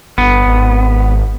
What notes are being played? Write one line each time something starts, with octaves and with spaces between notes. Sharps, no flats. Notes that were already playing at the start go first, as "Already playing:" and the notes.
G1 B3
G#1